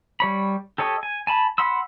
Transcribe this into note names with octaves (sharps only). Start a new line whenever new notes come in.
G3 C#5 B5
G4 A4 C#5 D#5
G#5
G#5 A5 B5
F#5 B5 C6 E6